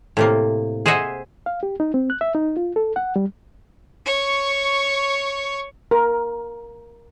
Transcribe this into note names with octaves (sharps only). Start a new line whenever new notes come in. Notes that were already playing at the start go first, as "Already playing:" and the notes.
A2 C3 A#3
G#4 C5 D#5 E5 F#5
F5
G4
D#4
C4
F#6
E5
D#4
F4
A4
F#5
G3
C#5 C#6
A#4